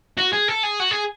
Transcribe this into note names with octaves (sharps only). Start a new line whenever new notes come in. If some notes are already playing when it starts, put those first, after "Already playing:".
F#4
G#4
A4
G#4
F#4
G#4